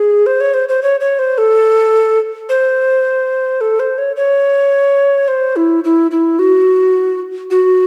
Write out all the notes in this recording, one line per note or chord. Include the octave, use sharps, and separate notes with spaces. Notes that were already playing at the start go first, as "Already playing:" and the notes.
Already playing: G#4
C5
C#5
C5
C5
C#5
C#5
C5
A4
C5
A4
C5
C#5
C#5
C5
E4
E4
E4
F#4
F#4